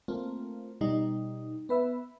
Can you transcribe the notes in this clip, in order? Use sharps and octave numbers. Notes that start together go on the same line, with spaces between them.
A3 A#3 C4 F4
B2 G3 D#4
B3 B4 E5